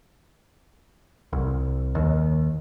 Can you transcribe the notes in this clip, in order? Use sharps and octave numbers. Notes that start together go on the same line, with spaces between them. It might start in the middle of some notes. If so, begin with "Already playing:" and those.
C2
D#2